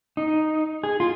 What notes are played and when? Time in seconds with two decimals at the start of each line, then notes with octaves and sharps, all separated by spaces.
0.17 D#4
0.84 G#4
1.00 F4